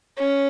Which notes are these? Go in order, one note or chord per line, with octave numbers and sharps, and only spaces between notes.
C#4